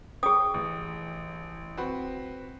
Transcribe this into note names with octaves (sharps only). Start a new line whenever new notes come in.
G#4 G5 D#6
A1
C4 F#4 B4